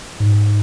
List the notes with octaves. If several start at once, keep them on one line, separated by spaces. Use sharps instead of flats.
G#2